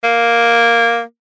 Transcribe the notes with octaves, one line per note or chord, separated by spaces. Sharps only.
A#3